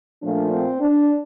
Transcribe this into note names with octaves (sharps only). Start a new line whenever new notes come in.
A#2 F3 A3 D4
C4
D4